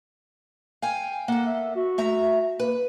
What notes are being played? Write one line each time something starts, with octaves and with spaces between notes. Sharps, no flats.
F5 G5 G#5
A#3 A4 F#5
E5
F#4
A3 E5 A#5
A#3 B4